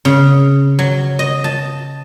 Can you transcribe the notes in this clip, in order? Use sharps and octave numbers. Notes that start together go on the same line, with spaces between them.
C#3
F#3
D#5
A5